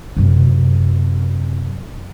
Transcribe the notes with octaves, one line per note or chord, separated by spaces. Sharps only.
F#2 C3